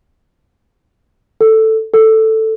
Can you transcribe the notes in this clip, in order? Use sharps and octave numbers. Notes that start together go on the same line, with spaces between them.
A4
A4